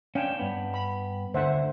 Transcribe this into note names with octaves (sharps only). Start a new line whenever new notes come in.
C#4 D4 F5 G5 G#5
G2 B3
B5
D2 D3 C5 E5 F#5